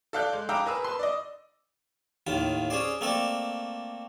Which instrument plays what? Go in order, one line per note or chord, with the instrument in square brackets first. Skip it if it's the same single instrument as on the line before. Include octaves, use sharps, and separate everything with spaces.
[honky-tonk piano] A4 D5 F5 D6 F#6 G6
G#3
F5 G5 A#5 B5 D6 E6
G#4 A#4 B4 E6
B4 C6
D5 D#5
[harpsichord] D#2 A2 D#3 F4
C#4 G#4 C5 D5
A3 A#3 C4 A4 D5